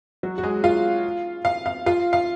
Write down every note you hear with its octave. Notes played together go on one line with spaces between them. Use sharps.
F#3 F#4
F#4
G#3 G#4
F4 F5
F5
F5
F4 F5
F5